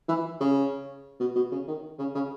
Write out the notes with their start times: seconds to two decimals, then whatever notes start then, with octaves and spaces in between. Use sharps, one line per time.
0.08 E3
0.41 C#3
1.20 B2
1.36 B2
1.52 C#3
1.68 D#3
1.98 C#3
2.15 C#3